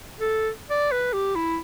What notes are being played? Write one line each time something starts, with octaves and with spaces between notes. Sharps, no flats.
A4
D5
B4
G4
E4